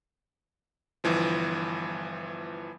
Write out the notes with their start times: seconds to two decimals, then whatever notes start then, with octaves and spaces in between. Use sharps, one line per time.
1.04 G1 E3 F3